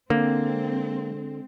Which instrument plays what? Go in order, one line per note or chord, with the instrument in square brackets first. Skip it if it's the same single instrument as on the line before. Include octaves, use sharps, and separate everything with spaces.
[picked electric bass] D3 [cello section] G#3 C4 [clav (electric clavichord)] A#3